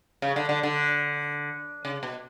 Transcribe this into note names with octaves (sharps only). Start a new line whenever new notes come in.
C#3
D3
D3
D3
C#3
B2